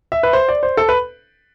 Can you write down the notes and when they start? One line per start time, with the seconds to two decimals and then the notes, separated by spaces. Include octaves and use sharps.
0.12 E5
0.23 B4
0.33 C5
0.49 D5
0.63 C5
0.77 A4
0.89 B4